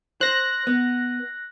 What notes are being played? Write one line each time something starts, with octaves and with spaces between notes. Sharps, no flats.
C5 F#6 A#6
B3